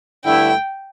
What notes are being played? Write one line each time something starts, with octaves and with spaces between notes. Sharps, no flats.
G2 D3 A3 E4 G5